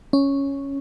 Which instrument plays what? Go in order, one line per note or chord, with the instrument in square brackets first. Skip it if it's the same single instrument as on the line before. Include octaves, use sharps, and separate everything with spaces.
[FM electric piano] C#4